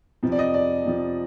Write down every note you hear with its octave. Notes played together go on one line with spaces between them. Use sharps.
F2 C3 F3
D5
D#5
D5
F2 C3 F3